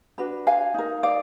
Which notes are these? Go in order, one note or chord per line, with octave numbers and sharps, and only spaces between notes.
D4 F#4 B4
F5 G#5
D#4 A#4
D5 F5